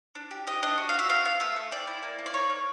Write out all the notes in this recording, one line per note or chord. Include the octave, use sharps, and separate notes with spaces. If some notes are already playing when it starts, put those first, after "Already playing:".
D4
G4
G4 D#5
D4 D#5
F#4
F5
F#4 E5
B3 F5
B3 F5
A3 E5
A3
C4 D5
E4
A#3
A#3
D5
D#4 C#5
A#3